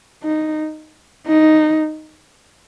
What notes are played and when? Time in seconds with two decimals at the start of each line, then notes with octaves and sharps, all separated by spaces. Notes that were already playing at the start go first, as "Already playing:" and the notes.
0.24 D#4
1.28 D#4